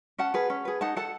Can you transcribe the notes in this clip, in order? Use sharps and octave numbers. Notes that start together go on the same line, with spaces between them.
C#4 F#5 A5
G#4 B4
C#4
G#4 B4
D#4 F#5 A5
A4 F#5 A5